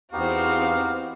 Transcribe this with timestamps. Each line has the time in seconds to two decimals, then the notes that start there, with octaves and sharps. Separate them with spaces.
0.13 E2 B3 C4 D#4 F#4 G4 F5